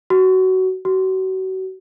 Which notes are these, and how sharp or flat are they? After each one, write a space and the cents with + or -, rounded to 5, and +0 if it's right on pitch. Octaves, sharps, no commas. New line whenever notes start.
F#4 +20
F#4 +35